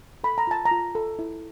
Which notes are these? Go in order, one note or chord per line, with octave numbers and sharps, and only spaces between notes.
A4 B5
A#5
F4 A5
A#5
F4
A4
E4